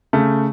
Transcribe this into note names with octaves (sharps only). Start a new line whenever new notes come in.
C#3 A3